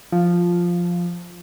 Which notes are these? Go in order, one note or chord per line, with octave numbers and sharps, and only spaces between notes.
F3